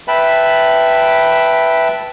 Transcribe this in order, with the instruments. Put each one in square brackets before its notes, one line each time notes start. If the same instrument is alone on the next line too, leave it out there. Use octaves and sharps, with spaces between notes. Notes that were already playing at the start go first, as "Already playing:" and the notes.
[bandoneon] B4 E5 G5 A5 B5